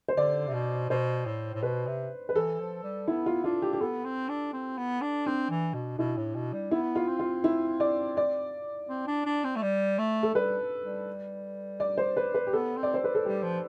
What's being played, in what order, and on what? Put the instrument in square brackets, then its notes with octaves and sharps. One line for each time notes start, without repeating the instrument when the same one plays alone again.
[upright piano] C5
[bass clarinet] D3 [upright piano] D5
[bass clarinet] C3
B2
[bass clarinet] B2 [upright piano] C5
[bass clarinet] A2
A2
[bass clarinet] B2 [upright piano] B4
[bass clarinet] C3
[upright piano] B4
[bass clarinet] E3 [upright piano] A4
[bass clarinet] F3
G3
[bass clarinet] B3 [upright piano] E4
[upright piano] F4
[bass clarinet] D4 [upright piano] F4
[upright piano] G4
G4
[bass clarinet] B3 [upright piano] A4
[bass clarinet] C4
D4
C4
B3
D4
[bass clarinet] C4 [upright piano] D4
[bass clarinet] E3
B2
[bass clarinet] B2 [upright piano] E4
[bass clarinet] A2
B2
G3
[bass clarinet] B3 [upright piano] E4
[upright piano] F4
[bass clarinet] C4
[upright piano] F4
E4
D5
D5
[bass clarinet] C4
D4
D4
C4
A3
G3
A3
[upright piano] A4
[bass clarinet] G3 [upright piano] B4
[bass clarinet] G3
[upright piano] D5
C5
B4
B4
G4
[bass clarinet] B3 [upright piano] A4
[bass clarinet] C4
[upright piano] D5
C5
B4
A4
[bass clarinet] G3 [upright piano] G4
[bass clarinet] F3